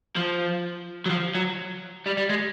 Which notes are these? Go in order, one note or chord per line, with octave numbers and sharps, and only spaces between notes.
F3
F#3
F3
F#3
G3
G3
G#3